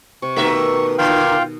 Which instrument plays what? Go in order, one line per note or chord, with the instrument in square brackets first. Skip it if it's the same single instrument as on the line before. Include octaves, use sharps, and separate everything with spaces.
[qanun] C3 [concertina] C#6
[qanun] B2 D#3 G4 [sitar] A3 A#4 E5
[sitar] A#2 D3 A#3 [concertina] F4 F5 G5